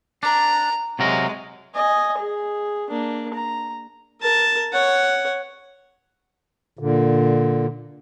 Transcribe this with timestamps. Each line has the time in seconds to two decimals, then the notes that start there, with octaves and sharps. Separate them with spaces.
0.23 D4 A#5
0.99 C3 F#3 G#3 A#4
1.75 D#5 G#5
2.17 G#4
2.90 A#3 D4
3.34 A#5
4.21 A#4 A5
4.72 C#5 F#5
6.79 A#2 D3